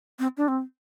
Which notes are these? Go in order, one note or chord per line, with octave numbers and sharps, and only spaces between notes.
C4
D4
C4